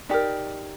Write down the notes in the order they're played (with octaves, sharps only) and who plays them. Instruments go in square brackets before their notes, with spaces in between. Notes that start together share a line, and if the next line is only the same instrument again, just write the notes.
[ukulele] D#4 G4 A#4 D5